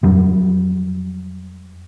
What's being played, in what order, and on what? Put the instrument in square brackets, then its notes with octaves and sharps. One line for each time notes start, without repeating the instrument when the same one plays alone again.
[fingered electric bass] F2 F#3 G3